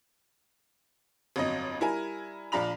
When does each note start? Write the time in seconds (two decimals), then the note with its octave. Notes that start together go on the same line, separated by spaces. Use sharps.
1.36 G1 F2 F#3 D#5
1.80 G3 E4 A#4 G#5
2.52 A#1 F3 D4 A#5 B5 F7